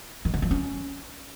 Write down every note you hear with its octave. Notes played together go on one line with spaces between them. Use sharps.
D#3
D3
F3
C#4